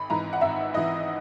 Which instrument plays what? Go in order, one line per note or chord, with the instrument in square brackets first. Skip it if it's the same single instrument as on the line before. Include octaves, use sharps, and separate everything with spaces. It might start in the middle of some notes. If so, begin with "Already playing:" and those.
Already playing: [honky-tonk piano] G#1 B5
G#2 E3 A#5
F#5
G#1 E5
G#2 E3 D#5